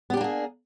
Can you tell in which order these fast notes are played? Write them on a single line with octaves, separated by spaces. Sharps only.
B3 G4 D4 A#3 G#4